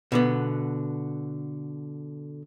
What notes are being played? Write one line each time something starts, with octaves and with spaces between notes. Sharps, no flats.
B2 D3 B3